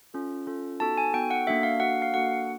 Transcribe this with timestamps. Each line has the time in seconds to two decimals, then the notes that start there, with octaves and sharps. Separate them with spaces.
0.14 C#4 F4 A4
0.47 C#4 F4 A4
0.80 B3 D#4 F#4 A4 A5
0.98 G#5
1.13 B3 D#4 F#4 A4 G5
1.31 F#5
1.47 A#3 D4 F#4 A4 E5
1.63 F5
1.80 A#3 D4 F#4 A4 F#5
2.02 F5
2.14 A#3 D4 F#4 A4 F#5